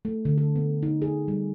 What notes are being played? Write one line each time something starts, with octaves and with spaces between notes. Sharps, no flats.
A3
D3
A4
B3
D#4
G#4
G3